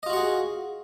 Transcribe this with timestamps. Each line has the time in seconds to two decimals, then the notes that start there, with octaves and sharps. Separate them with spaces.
0.03 D#5
0.06 F4
0.10 F#4
0.13 F#5
0.16 G#4